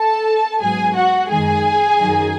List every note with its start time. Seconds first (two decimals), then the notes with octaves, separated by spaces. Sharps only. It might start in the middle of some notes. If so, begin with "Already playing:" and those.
Already playing: A4 A5
0.60 G#2 F#3 B3 G#4 G#5
0.95 F#4 F#5
1.29 F#2 D#3 G#3 G#4 G#5
1.98 F#2 D#3 F#3